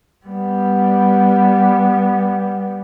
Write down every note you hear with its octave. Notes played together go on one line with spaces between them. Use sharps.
G3 B3